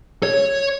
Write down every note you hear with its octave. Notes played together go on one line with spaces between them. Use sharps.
C#5